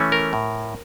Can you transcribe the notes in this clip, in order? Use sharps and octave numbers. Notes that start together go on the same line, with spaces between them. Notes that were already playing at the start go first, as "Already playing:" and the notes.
Already playing: E3 A3 C#4
A#4
A2